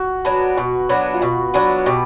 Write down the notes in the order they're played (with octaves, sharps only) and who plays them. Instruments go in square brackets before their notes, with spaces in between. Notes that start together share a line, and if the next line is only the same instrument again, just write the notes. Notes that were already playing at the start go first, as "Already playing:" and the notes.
Already playing: [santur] F#4
[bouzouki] F#3 B3 D4
[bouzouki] B2 [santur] F#4
[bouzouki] F#3 B3 D4
[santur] F4
[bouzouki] B2 [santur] F#4
[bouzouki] F#3 B3 D4 [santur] F#4
[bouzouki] B2 [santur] G4